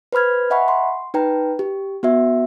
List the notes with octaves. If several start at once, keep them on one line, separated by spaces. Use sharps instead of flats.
B4 C5 B5 F6 G#6
D#5 E5 F#5 G#5 B5 C#6
C6
D#4 B4 G5 A#5
G4
B3 F#4 E5